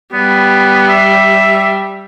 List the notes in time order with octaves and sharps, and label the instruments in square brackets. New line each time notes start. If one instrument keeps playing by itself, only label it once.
[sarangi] G3 [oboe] B3
[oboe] E5